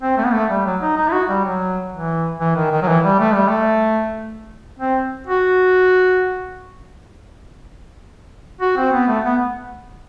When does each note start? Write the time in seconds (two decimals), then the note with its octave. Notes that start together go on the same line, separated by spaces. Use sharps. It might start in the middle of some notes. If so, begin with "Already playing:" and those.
0.02 C4
0.18 A3
0.25 B3
0.33 A3
0.50 G3
0.66 F#3
0.82 D#4
0.97 D#4
1.08 E4
1.12 F#4
1.29 G3
1.45 F#3
1.93 E3
2.40 E3
2.56 D#3
2.72 D#3
2.82 F#3
2.88 E3
3.05 G3
3.20 A3
3.34 G3
3.47 A3
4.79 C4
5.27 F#4
8.61 F#4
8.77 C4
8.93 B3
9.08 A3
9.24 B3